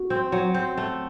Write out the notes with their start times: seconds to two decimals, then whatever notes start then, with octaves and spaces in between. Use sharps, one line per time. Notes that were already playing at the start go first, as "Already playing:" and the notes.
Already playing: F#4
0.10 C4
0.32 F#3
0.54 C4
0.78 A3